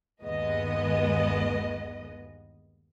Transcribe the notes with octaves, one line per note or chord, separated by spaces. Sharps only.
G1 D#2 G#3 B3 D#5